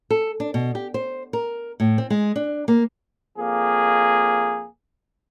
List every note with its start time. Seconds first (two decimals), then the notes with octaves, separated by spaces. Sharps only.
0.10 A4
0.40 D4
0.54 B2
0.75 G4
0.94 C5
1.33 A#4
1.80 A2
1.98 C4
2.10 G#3
2.36 D4
2.68 A#3
3.38 F2 A#3 G#4